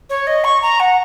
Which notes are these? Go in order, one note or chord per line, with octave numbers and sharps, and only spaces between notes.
C#5
D#5
C#6
A#5
F#5